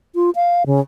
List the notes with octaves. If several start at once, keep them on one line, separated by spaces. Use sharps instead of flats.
F4
F5
C#3